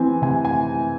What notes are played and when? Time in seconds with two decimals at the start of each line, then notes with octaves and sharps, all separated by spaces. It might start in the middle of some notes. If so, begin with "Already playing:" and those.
Already playing: E3 C4 G#5
0.22 C3 G#5
0.45 G#5